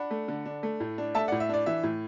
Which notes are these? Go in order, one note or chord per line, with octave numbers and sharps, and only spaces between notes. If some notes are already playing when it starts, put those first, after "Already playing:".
Already playing: D4 F#5 B5
A3
D3
D4
A3
A2
D4
A3 E5 A5
A2 D5 F#5
E5
D4 D5
E3 E5
A2